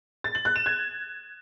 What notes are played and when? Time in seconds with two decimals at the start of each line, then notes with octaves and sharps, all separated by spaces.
0.24 A6
0.35 F#7
0.45 F#6
0.56 E7
0.66 G#6